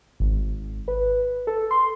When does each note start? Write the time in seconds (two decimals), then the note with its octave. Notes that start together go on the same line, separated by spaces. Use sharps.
0.20 G#1
0.88 B4
1.47 A4
1.71 C6